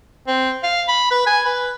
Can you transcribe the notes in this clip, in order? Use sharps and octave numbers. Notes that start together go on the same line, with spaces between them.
C4
F5
B5
B4
G#5
B4